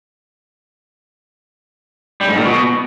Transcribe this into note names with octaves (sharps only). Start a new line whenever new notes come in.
G3
G#2
A#2
B2